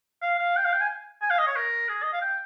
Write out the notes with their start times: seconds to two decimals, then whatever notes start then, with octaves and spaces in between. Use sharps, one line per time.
0.22 F5
0.39 F5
0.56 G5
0.64 F5
0.73 G5
0.81 G#5
1.22 G#5
1.30 F5
1.39 D#5
1.47 C#5
1.56 A#4
1.89 G#4
2.03 D#5
2.13 F5
2.21 G5